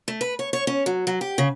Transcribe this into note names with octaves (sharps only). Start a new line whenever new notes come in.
A3
B4
C#5
C#5
C#4
F#3
F#3
G4
C#3